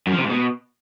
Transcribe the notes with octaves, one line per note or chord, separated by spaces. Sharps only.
F#2
F3
C3
G#2
B2